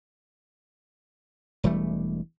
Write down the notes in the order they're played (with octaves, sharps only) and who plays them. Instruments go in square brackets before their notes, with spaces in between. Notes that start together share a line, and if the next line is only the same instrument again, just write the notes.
[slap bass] E1 E3 G3 A3